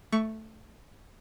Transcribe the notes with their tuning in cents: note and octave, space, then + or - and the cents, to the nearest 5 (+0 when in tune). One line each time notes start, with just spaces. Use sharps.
A3 +0 C#6 +15